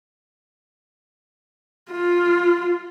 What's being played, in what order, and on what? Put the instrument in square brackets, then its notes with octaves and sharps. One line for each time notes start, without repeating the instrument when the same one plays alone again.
[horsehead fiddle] F4